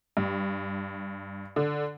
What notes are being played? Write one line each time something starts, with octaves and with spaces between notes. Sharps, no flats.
G2
D3